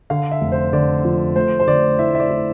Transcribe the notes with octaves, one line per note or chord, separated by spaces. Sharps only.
D3 F5
E5
F1
C5
D3 D5
F3
A3 C5
C5
D3 D5
E4 E5
E5
D5
E4